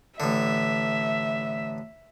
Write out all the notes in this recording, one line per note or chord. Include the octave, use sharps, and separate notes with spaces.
A1 D3 E5